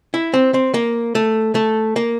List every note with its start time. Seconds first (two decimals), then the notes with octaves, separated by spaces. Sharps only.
0.14 E4
0.34 C4
0.54 C4
0.74 A#3
1.15 A3
1.55 A3
1.96 A#3